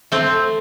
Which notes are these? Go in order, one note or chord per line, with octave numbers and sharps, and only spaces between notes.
A3 C4